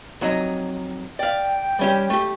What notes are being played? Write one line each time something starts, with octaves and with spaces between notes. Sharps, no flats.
F2 F#3 D#4
D5 F5 G5
G3 C#4 G4
A3 G4